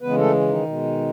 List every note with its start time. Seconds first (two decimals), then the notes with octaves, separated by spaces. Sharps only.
0.01 C#3 E3 G#3 B3 B4
0.18 A3 A4
0.48 D#3 D#4
0.65 B2 G#3